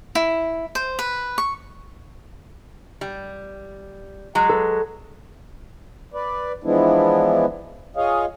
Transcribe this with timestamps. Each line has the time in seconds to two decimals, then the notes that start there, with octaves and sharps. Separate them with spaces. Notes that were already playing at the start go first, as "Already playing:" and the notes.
0.15 E4
0.75 C5
0.99 B4
1.38 C#6
3.01 G3
4.35 F#3 G#3
4.49 A4
6.14 B4 D5
6.64 E3 F3 G#3 B3 D4 E4
7.96 F4 G#4 C#5 D#5 F5